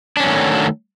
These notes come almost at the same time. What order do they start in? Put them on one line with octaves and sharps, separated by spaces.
D4 C#4 F#3 D#3 A3